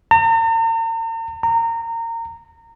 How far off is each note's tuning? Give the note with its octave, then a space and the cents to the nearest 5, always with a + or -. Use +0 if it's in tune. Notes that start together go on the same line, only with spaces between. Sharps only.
A#5 -45
A#5 -25